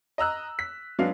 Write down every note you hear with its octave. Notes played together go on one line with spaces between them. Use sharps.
D#5 A#5 E6 F#6
B6
F#3 G#3 B3 D4 F5